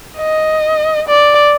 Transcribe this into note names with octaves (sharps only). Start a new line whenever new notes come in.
D#5
D5